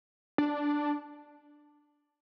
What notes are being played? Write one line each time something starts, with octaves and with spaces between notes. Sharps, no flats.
D4